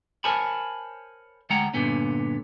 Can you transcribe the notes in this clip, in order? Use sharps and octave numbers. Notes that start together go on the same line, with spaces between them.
A#4 C5 C#5 G#5 A5 B5
D2 G#3 F#5 G5 A#5
G2 A#2 D3 B3 C#4